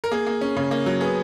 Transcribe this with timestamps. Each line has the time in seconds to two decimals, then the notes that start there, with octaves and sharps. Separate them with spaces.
0.04 A#4
0.12 A#3 G#4
0.27 A#3
0.41 C#4
0.57 C#3
0.71 A#3
0.86 F#3
1.01 B3 G#4